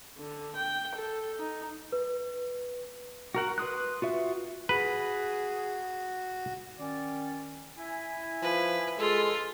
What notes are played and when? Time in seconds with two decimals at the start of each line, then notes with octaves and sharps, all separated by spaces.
0.19 D3
0.56 G5
0.95 A4
1.38 D#4
1.92 B4
3.35 F#4 A#4 F#5
3.58 B4 C6 D#6 F#6
4.02 F4 F#4 E5
4.69 F#4 G#4 B4
6.78 D#3 C#4 D5
7.77 E4 E5 G#5
8.42 F3 B4
8.99 G#3 F4 A4